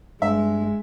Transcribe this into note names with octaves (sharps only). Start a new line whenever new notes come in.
G2 G#3 E5